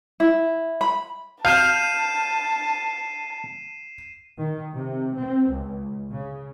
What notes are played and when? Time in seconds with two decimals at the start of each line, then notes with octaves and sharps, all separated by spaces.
0.20 E4
0.81 B5
1.45 F5 A5 F6 G6 C7 D#7 E7
4.39 D#3
4.75 C3
5.16 C4
5.51 C#2
6.10 C#3